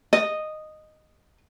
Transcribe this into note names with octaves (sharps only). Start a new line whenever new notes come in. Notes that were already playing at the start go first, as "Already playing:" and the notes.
D#5